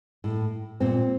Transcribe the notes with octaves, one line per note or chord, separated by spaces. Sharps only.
A2
A#2 C4